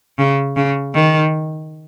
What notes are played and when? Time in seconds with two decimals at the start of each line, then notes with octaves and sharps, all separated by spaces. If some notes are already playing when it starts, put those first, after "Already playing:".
0.18 C#3
0.56 C#3
0.94 D#3